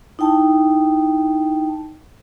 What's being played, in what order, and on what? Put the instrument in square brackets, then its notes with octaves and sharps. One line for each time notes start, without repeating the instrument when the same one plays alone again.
[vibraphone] D#4 E4 G5 A5